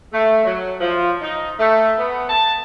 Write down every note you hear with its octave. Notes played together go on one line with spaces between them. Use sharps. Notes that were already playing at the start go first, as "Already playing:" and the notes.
A3
F#3
F3
D#4
A3
B3
A5